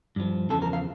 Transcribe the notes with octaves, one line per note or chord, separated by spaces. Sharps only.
G2 F3
E2 C#3 F3 A4
A#4
F5